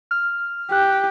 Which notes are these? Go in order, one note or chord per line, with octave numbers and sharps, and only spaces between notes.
F6
G4 F#6